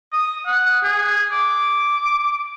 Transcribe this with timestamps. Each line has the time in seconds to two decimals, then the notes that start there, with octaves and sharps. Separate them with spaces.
0.13 D#6
0.46 F#5
0.83 G#4
1.32 D6